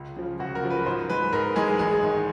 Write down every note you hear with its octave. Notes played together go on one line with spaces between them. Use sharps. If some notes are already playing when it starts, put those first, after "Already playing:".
Already playing: C#2
C#3 F3
C#2 F#4
A#4
C#3 F3
B4
G#2 C5
E3 G#3 B4
G#2 A#4
E3 G#3 G#4
A1 G#4
G#2 D#3 G#3